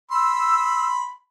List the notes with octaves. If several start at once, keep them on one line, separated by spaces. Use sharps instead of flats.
B5 C6 E6